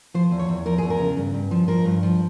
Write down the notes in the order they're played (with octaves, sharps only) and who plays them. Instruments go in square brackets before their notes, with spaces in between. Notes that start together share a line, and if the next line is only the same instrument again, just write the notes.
[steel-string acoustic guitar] F3 C5
E2
C#5
E2
F3 A#4
E2 G#4
A#4
C#3
G2
G2
F3
F3 A#4
G2
F3